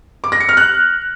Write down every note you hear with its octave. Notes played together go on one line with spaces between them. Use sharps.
D6
A#6
C#7
F6
F#6